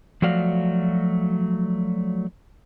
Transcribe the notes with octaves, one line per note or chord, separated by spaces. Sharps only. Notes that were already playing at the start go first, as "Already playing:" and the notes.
F3 F#3 A3 F#4 D5 F5